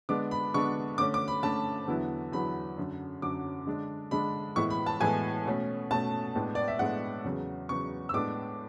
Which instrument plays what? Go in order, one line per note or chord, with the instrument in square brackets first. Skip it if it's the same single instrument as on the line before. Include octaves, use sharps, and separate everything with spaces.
[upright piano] D3 G#3 B3 D4 D6
B5
D3 G#3 B3 D4 C#6
D3 A3 C#4 D6
D6
B5
D3 A3 C#4 A5
E2 D3 F#3 B3 E4
E2 D3 F#3 B3 E4 B5
F#2 D3 F#3
F#2 D3 F#3 D6
D3 G#3 D4
D3 G#3 D4 B5
A2 E3 G#3 B3 E4 C#6
B5
A5
A2 E3 G#3 B3 E4 G#5
B2 A3 C#4
B2 A3 C#4 A5
A2 G#3 B3 D4
D5
E5
A2 G#3 B3 D4 F#5
E2 C#3 F#3 B3
E2 C#3 F#3 B3 C#6
E6
A2 G#3 B3 D4 D6